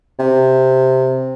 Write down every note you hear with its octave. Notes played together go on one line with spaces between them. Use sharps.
C3